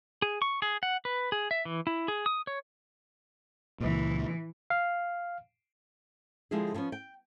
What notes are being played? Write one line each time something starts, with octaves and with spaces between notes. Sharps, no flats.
G#4
C#6
G#4
F#5
B4
G#4
E5
E3
E4
G#4
D#6
C#5
C#2 A#2 E3
F5
D3 F3 G#3 E4 G4 G#4
D3 F3 B3 C#4
G5